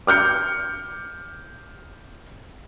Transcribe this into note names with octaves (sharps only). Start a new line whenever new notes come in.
D6 F6 G6 C#7